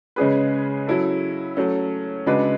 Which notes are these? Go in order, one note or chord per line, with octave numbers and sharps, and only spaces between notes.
C#3 G#3 C#4 G#4 B4
F#3 C#4 E4 A4
F#3 A3 C#4
C#3 G#3 D4 F#4 B4